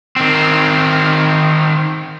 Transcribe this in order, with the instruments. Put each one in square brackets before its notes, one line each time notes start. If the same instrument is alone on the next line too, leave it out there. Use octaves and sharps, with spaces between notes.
[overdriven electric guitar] D#3 C4